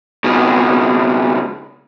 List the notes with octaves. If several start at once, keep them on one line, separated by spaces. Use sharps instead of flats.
C#2 B2